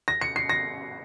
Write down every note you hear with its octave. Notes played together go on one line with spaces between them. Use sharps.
A#6
C#7
C7
A#6